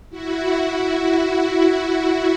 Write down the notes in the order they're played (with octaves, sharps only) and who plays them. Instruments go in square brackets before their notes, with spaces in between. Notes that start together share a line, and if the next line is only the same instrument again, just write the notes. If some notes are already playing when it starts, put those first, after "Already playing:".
[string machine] E4 F#4